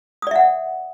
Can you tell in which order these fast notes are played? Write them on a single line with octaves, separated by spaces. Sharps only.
D#6 D5 E5 F#5